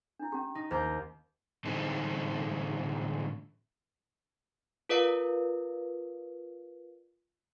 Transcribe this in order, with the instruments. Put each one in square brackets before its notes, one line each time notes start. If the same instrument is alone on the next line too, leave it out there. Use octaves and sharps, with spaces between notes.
[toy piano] D4 E4
C#4 G4
[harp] D#4
[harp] D#2 A#5 G6 [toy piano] C5
[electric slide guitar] A2 D3 E3 G3 C4 D#4
[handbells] F4 A#4 B4 D5 F5